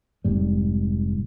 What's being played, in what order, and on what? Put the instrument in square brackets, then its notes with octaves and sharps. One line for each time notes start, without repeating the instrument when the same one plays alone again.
[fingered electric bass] F1 G#2 G3